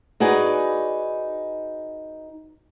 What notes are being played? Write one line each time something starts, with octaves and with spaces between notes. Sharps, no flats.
D#4 F#4 G#4 B4 D5